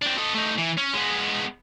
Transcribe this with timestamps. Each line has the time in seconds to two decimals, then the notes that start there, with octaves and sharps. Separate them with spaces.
0.02 C4 D4
0.18 A4 D#5
0.35 A3 D#4
0.59 E3
0.78 C#4
0.93 G#3 B3